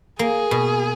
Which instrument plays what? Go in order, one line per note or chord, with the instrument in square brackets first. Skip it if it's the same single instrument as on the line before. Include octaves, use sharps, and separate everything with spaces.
[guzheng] A#3 [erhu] G#4
[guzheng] B2